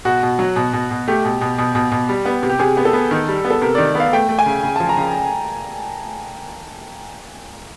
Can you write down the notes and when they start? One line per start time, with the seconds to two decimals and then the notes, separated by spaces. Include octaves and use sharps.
0.05 B2 F#4
0.23 B2
0.39 F#3
0.56 B2
0.73 B2
0.91 B2
1.08 A3 G4
1.25 B2
1.41 B2
1.58 B2
1.75 B2
1.91 B2
2.09 G3
2.26 B3
2.43 C3
2.49 G4
2.59 C3 G#4
2.77 B3
2.85 A4
2.93 B3
3.11 D#3
3.28 G3
3.45 B3
3.50 A4
3.62 C3 A#4
3.75 D#3 D5
3.95 B3 F5
4.13 A3 G5
4.29 A3
4.39 G#5
4.46 C#3
4.63 C#3
4.76 F3 A5
4.89 A#5
4.97 C#3